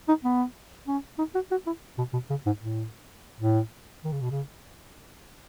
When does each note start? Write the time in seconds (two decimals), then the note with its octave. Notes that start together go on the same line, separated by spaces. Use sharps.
0.08 D#4
0.24 B3
0.87 C#4
1.18 D#4
1.35 F#4
1.51 F#4
1.66 E4
1.98 B2
2.13 B2
2.30 C#3
2.46 G#2
2.61 A2
3.41 A2
4.04 D#3
4.12 C#3
4.21 B2
4.30 C#3